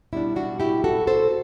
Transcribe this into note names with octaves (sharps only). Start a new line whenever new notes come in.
B2 G3 D4 E4
D4 F#4
E4 G4
F#4 A4
A4 C5